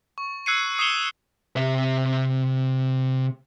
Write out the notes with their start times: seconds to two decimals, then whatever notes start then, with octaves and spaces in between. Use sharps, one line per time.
0.18 C#6
0.46 E6 F#6 G#6 C7 C#7 D#7
0.79 D#6 C7 C#7 E7 G7
1.56 C3 E5